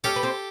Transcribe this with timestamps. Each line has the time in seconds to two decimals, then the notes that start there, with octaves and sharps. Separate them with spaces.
0.04 C#4 G4 A4 C#5
0.16 B4
0.23 C4 C5